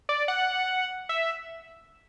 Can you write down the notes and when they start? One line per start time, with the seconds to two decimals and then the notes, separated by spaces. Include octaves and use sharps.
0.09 D5
0.28 F#5
1.09 E5